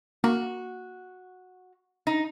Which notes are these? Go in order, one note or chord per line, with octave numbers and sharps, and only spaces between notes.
A#3 F#4
D#4